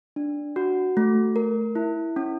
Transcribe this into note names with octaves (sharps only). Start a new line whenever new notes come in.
D4
F#4
A3
A#4
E4
C#4